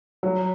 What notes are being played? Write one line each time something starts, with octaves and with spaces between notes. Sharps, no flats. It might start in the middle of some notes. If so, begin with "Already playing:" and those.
F#3